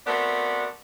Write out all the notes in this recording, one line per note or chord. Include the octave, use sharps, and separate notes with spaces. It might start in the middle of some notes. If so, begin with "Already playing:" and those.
A3 B3 C4 F#4 A#4 D5